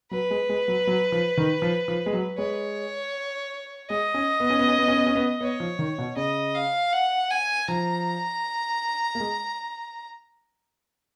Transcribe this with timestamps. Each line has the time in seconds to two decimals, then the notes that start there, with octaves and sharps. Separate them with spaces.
0.11 F#3 B4
0.31 G#3
0.49 G#3
0.68 F#3
0.87 F#3
1.12 F3
1.38 D#3
1.62 F3
1.88 F3
2.06 G#3
2.13 F#3
2.38 G#3 C#5
3.90 G#3 D#5
4.14 C#4
4.40 B3
4.50 C#4
4.59 B3
4.68 C#4
4.78 B3
4.88 C#4
4.97 B3
5.06 C#4
5.15 B3
5.41 B3 C#5
5.60 F3
5.79 D#3
5.98 B2
6.16 C#3 D#5
6.55 F5
6.92 F#5
7.31 G#5
7.68 F3 A#5
9.15 A#3
9.20 G#3